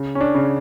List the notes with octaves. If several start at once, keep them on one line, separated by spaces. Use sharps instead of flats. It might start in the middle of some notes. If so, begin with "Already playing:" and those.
Already playing: C#3
C#4
D4
C#3